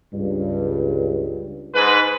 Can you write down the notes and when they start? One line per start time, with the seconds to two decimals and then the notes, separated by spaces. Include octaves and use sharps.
0.13 C#2 G2
1.75 G#2 B4